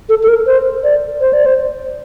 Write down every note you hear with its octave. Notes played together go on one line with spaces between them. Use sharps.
A4
A4
A#4
C5
D5
C5
D5
C5